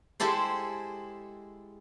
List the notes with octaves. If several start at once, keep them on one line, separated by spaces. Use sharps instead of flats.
G#3 E4 G4 A4 C5